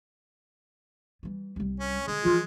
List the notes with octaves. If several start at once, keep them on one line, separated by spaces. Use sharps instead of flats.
E3 G3
C2 G3
C#4
D3 G#3 F4
E3 F3 F4